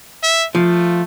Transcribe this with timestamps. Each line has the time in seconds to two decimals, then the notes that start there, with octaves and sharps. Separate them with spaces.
0.23 E5
0.55 F3 A3